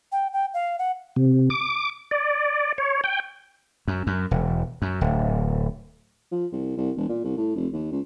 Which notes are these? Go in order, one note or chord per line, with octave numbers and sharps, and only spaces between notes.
G5
G5
F5
F#5
C3
D6
D5
C#5
G5
F#2
F#2
E1
F#2
D1
F3
C2
C2
E1
A#2
C2
A2
F1
D#2
C#2